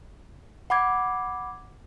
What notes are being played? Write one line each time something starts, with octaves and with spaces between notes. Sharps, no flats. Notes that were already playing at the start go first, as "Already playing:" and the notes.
F#5 B5 D6 G#6